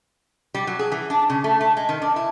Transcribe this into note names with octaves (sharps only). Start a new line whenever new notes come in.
G3
F#3
G#4
E3
D4
C#3
A3
A3
G#3
D#3
D4
E4